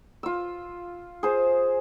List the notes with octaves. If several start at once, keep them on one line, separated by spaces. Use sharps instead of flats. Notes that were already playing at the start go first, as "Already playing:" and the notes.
F4 E6
G#4 C5